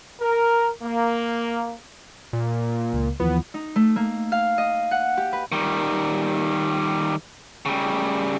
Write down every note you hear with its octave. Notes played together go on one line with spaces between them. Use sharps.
A#4
A#3
A#2
C#2
D#2 E3 F3 B3
D#4
A3
A#3
F5
D#5
F#5
G4
B4
D#3 G3
C#3 G3